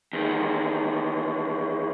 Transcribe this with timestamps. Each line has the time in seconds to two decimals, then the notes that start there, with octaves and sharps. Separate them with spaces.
0.13 E2 D#3